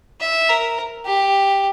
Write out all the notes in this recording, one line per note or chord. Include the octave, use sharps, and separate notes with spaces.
E5
A#4
G4